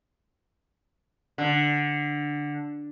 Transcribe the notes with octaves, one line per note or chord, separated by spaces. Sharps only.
D3